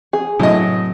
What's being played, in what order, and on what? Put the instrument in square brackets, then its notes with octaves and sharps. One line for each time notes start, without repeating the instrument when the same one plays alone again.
[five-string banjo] G#4
[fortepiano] A2 D#5 [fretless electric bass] C3 F#3 B3